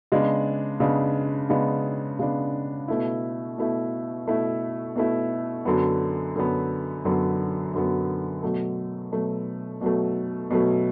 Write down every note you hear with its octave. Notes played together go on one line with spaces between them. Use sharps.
C#3 G#3 B3 D4
C#3 G#3 B3 D4
C#3 G#3 B3 D4
C#3 G#3 B3 D4
B2 A3 E4
B2 A3 E4
B2 A3 E4
B2 A3 E4
F#2 D3 F#3 B3
F#2 D3 F#3 B3
F#2 D3 F#3 B3
F#2 D3 F#3 B3
B2 F#3 A3
B2 F#3 A3
B2 F#3 A3
B2 F#3 A3